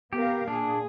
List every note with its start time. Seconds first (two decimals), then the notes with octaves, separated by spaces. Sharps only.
0.13 B3 G4 A#4 F5
0.48 A#2 D4 G#4